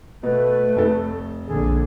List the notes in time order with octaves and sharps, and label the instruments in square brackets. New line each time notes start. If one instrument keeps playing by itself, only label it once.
[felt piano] B2 [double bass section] A3 [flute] B4
[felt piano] F1 A4
[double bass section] A#1 D3 [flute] G#4